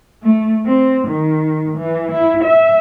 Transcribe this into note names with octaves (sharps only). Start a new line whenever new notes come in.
A3
C4
D#3
E3
E4
E5